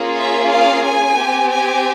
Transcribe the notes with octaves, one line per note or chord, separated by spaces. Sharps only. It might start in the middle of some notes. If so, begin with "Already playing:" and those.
Already playing: A#3 C#4 F4 G#4
E5
F5
G#5
C4 G4
G#5